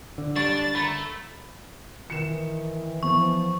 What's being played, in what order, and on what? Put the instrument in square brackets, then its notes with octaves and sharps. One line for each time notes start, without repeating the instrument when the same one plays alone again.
[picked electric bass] D3
[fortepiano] G3 C#6 [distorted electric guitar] D4 [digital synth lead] A6
[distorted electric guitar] A3 [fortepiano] A#5 B5
[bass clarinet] D#3 [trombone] E3 [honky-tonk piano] C#7 E7
[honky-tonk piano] E2 [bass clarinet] F3 [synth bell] C#6